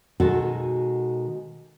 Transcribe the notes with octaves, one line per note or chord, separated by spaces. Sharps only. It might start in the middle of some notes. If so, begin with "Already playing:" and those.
B2 D#3 G#3 F#4 A4